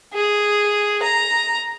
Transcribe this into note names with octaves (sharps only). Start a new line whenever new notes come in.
G#4
A#5